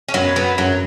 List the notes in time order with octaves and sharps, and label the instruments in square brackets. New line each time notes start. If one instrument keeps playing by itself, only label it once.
[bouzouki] C#4
[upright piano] F#2 [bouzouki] F#3 B3
[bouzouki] F#3 B3
[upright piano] F#2 [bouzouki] F#3